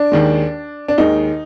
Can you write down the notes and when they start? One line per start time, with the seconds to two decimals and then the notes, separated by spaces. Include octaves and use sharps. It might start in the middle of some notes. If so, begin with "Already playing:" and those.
Already playing: D4
0.12 D#2 D#3 G#3
0.88 D4
0.98 D#2 D#3 G#3 D#4